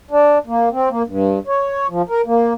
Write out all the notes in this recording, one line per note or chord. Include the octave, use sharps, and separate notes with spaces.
D4
A#3
C4
A#3
G2
C#5
F3
A#4
A#3